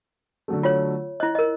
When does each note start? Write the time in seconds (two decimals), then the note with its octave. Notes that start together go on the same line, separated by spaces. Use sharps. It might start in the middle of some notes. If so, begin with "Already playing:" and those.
0.48 D3 F#3 A3
0.63 F4 C#5
1.20 E4 D#5 F#6
1.35 A#4 D#5